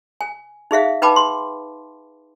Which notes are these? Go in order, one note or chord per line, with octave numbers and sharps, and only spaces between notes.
G#5
D#4 G#4 E5 F5
D#4 B4 G5 A5 B5 D6
C6